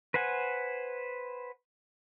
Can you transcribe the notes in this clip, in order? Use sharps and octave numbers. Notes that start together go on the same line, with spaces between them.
B4 C5 F#5 G#5